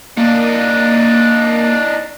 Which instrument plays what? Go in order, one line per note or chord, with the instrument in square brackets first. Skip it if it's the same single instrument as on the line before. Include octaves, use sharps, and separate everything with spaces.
[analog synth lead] A#3 [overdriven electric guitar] D4 D#4